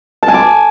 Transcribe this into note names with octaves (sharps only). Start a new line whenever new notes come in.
A5
G#5
D6